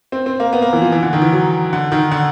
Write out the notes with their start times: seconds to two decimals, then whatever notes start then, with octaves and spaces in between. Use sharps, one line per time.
0.12 C4
0.26 C4
0.40 A#3
0.53 B3
0.62 A#3
0.73 E3
0.82 F3
0.92 E3
1.02 D3
1.13 D#3
1.22 E3
1.32 F#3
1.73 D3
1.92 D#3
2.11 D3